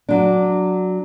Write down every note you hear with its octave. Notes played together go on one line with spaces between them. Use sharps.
F#3 D4